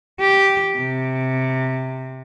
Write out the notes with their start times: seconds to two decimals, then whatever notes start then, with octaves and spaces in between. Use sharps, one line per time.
0.20 G4
0.77 C3